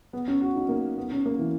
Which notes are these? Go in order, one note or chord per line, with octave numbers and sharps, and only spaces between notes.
B3
C#4
F#4
D#4
A#3
B3
C#4
A#3
E3